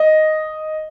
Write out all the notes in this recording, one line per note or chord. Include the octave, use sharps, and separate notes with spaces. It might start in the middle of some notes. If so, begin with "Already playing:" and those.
Already playing: D#5